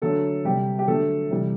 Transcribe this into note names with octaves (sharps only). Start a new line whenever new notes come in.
D3 F#3 A3 A4
C3 G3 G4
G4
D3 F#3 A3 A4
C3 E3 G3